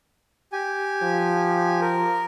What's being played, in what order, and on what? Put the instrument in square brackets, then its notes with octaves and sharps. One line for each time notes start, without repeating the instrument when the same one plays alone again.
[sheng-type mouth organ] G4 G#5
[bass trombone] F3
[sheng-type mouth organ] A#4